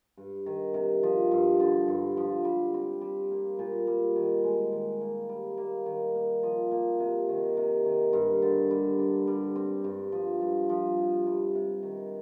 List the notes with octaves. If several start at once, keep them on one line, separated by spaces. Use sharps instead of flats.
G2
D#3
C3
F3
G2
D3
G2
F3
G3
C4
G3
A#3
A#2
G3
D#3
G#3
D#3
A#3
G3
A#3
D#3
A#3
F3
A#3
C3
D#3
C3
D#3
G2
D3
G3
D4
G3
C4
G2
F3
G2
F3
C3
G3
C3
D#3